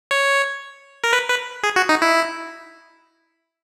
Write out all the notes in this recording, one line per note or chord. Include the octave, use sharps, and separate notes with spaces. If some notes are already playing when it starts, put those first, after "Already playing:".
C#5
A#4
B4
B4
G#4
F#4
D#4
E4